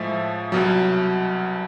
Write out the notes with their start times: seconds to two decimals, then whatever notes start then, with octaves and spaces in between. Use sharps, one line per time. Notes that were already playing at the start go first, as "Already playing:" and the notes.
Already playing: A2 F3 G#3 E5
0.52 C2 B2 F#3